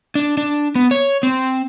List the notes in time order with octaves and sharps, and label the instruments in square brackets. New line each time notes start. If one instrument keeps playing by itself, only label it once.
[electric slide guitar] D4
D4
B3
C#5
C4